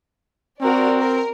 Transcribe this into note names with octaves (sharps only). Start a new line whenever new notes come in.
C4 F#4 A#4 D5
A#4